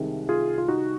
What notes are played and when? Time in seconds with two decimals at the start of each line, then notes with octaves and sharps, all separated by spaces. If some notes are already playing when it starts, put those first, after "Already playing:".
Already playing: C2 C3 D#3 G#3
0.29 F4 G#4
0.58 F4
0.68 D#4 F#4